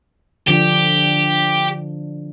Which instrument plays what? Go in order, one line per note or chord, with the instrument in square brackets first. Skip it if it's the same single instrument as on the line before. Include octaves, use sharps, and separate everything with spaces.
[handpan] D3 F3 D4 [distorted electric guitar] G4